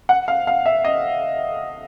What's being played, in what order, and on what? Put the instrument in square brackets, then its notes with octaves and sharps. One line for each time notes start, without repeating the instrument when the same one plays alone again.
[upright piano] F#5
F5
F5
E5
D#5